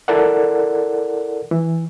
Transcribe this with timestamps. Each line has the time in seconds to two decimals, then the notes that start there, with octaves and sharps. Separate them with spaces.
0.08 E4 A4 A#4 D5 F#5
1.51 E3